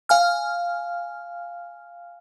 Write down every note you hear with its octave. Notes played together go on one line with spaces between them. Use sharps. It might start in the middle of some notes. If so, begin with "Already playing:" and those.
F5 G#5 F6